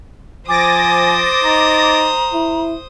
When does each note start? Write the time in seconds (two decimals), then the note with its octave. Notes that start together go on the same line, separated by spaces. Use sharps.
0.49 F3 C5 G#5 D6 D#6 A6 A#6
1.44 D#4 A#5
2.33 E4